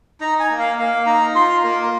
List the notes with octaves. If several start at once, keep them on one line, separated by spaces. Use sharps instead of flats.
D#4 A#5
G#5
A#3
F5
A#3 F5
D#4 A#5
F4 C6
A#3 A#4